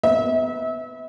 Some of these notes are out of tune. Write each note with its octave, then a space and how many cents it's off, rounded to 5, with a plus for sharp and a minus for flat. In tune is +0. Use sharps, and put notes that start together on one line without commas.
B3 +15 E5 -35